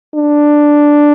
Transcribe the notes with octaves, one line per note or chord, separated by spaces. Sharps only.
D4